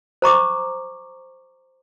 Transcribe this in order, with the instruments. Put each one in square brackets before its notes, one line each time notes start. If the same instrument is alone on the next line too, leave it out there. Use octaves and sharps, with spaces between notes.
[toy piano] C5 A#5 C#6 D6